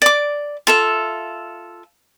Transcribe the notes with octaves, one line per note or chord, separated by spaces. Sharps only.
D5 D6
F4 A4 E5